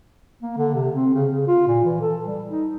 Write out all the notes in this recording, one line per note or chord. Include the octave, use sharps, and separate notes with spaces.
A#3
D3
C3
C4
C#3
C#3
F4
A#2
E3
A4
G3
D#4